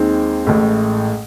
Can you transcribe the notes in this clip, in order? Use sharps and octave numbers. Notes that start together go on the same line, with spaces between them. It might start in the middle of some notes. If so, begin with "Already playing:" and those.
Already playing: D#2 D#3 G#3 C4
A1 A2 G#3